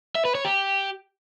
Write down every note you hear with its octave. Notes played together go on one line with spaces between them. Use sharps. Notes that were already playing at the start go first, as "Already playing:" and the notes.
E5
B4
C#5
G4